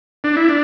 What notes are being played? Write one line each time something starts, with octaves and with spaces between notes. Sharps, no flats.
D4
E4
D4